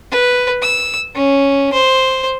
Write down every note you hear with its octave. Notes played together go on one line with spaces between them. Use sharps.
B4
E6
C#4
C5